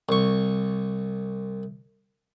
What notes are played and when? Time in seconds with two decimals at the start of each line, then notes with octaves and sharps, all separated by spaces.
0.09 C2 C#6